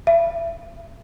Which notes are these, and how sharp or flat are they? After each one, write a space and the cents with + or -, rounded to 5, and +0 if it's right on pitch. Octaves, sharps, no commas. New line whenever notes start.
E5 +35